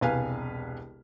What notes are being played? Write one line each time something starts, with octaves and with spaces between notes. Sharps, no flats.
E1 C2 B4 F5 G#5 F6